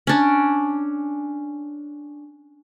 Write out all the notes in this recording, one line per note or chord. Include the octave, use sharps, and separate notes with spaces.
C#4 D4